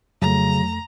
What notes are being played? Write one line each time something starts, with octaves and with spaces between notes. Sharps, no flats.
F2 C#3 F#3 A3 A#5